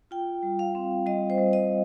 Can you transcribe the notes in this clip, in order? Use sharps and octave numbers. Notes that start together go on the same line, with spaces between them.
F4 G5
G3
F5
C4
G3 D#5
C5
G3
D#5